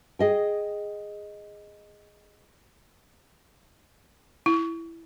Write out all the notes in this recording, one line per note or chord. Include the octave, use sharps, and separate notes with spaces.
G#4 D#5 G5
E4